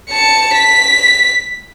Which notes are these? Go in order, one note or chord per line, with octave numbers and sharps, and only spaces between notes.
A5 C#7
B6